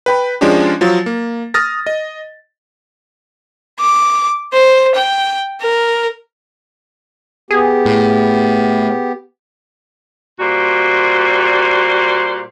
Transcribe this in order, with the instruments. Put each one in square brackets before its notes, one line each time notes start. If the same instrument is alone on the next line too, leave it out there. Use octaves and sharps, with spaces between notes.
[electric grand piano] B4 G5 B5
F3 G#3 C#4 D4 F4 G4
F3 F#3 F4 A6
A#3
D#6 F6 A6 A#6
D#5
[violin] D6
C5
G5
A#4
[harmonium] B3 G4 [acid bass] G#4
[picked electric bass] A2
[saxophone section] A#2 G3 F#4 C5